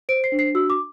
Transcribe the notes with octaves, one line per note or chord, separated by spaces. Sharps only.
C5 D7
C7
D4
C7
F#4 E6
D6